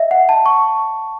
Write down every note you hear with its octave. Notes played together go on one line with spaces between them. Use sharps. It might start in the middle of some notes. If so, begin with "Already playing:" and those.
Already playing: D#5 E5
F#5
A5
C#6